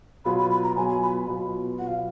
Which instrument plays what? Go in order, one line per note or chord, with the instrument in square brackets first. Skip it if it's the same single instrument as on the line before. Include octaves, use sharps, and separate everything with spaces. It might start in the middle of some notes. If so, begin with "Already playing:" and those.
[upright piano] B2 F#3 B3 F4 [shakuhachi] B5
[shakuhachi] B5
B5
A#5
[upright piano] B2 F#3 B3 F4 [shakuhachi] G#5
[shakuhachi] G#5
B5
[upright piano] B2 F#3 B3 F4
[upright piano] B2 F#3 B3 F4 [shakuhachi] F#5
[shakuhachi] F5